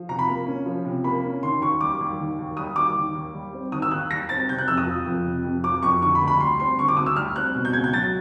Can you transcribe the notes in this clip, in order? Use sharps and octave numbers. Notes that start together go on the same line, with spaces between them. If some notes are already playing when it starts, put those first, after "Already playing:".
Already playing: F3
C3 A#5
B5
A#3
C#4
F3
C3
A#3 B5
C#4
D#3 C6
D#2 C#6
G3 D6
D#2
D#3
D#2
G3 D#6
D#2 D6
D#3
D#2
G3
C4
D#3 D#6
E6
D#2 F#6
G3 A#6
C4 A6
C3 G6
F#6
F2 E6
D#6
F3
F2
C3
F2
F3 D6
F2 C#6
D3 C#6
B5
D2
B5
G3 C6
C4 C6
D3 C#6
D6
D2 D#6
E6
G3 F6
C4 F#6
B2
G6
C#2 G#6
G6
F#3 A6